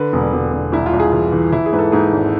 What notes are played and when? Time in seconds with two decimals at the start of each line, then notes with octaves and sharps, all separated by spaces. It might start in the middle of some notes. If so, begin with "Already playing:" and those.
Already playing: D3 B4
0.13 E1
0.33 E1
0.53 E1
0.72 C2 E4
0.86 F4
0.93 C2
1.00 G#4
1.12 E3 F4
1.32 E3
1.52 E3 E4
1.66 G#4
1.72 G#2 B4
1.78 A4
1.92 G#2 G#4
2.12 G#1